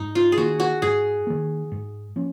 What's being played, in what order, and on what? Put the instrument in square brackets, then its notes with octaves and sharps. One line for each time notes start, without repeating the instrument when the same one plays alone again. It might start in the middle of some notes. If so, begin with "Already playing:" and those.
Already playing: [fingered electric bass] G#2 [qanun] D#4
[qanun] F4
G#4
[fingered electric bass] D#3 A#3 [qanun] F#4
[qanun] F#4
[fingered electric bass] G#2 [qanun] G#4
[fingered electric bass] D#3 A#3
G#2
F3 A#3 C#4